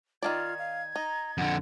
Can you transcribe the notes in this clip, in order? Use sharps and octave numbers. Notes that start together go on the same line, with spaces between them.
D#3 A3 F4 D5 G#6
F5
D#4 A#5
F2 D3 F#5